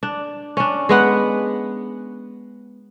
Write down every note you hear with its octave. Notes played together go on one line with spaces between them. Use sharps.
D4
C#4 D4
G#3 B3 F#5